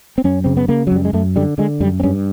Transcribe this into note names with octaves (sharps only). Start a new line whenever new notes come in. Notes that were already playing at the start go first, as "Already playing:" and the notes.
C4
F#2 C#4
C#3 C4
B3
C#3 A#3
F#3
F#2 G3
G#3
F#2 A3
D3 G3
D3 G#3
F#2 G3
C4
G2 C#4